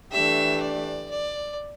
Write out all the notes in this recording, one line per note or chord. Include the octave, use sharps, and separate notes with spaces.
E3 A3 D4 G4 E5
D5
D5